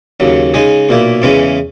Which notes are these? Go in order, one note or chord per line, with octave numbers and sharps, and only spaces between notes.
D#2 C#3 F#3
C#3 G#3 D#4 G#4
B1 A#2 A#3 E4
E2 C#3 E3 G#3 C#4